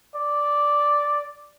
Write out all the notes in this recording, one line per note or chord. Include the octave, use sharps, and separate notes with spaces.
D5